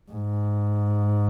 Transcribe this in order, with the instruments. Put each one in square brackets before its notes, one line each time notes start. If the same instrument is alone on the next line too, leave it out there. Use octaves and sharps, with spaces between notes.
[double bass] G#2